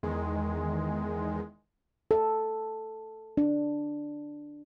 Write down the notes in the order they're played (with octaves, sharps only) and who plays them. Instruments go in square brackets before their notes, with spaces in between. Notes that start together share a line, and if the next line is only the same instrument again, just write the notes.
[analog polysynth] E2 D#3 G#3
[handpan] A4
D4